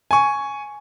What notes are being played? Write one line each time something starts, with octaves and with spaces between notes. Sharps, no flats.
G#5 C#6